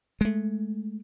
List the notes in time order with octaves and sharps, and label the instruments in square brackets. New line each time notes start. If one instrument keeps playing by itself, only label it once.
[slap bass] G#3 A3